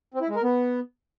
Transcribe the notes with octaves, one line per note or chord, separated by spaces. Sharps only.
C4
E4
G#3
A#4
B3